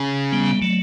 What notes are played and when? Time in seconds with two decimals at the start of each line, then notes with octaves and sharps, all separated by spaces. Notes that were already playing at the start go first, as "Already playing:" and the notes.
Already playing: C#3
0.33 G3 B3
0.62 F#3 A3